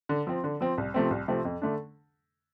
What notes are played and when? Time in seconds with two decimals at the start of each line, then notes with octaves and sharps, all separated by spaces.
0.09 D3
0.27 F3 C4
0.44 D3
0.61 F3 C4
0.78 C2
0.94 C3 F3 A3 C4
1.11 C2
1.28 C3 F3 A3 C4
1.45 F2
1.62 D3 A3 D4